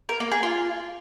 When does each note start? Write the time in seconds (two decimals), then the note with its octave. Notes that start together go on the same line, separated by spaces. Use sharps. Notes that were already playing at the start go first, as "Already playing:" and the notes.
0.09 A#4
0.20 A#3
0.32 G#4
0.43 F4